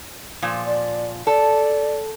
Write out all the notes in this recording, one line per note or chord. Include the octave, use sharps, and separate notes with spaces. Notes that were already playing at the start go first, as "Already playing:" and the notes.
A#2 F3
D5
A4 D5